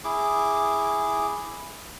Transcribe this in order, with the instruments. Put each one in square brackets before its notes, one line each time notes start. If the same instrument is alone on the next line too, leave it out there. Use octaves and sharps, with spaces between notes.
[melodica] E4 G#4 D6